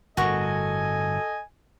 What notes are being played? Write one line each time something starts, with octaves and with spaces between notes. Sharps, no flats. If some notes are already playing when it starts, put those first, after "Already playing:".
G1 A2 F#4 A4 A#4 D#5 G#5 C#6